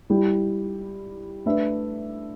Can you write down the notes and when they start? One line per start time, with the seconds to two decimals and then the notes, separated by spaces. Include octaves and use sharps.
0.10 G3 E4 G4
1.46 A3 D4 B4 E5